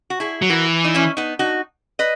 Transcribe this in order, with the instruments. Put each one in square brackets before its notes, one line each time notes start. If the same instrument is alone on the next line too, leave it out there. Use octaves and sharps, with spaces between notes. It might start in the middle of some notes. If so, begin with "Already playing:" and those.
[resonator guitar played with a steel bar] F#4
E4 G#4
[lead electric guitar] F#3
[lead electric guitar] E3 [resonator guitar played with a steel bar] F#4 A#4
[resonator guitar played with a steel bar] D#4
C#4 E4
B3 D#4
D#4 F#4
B4 D#5